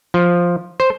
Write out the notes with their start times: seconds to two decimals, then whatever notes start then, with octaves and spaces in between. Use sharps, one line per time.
0.14 F3
0.80 C5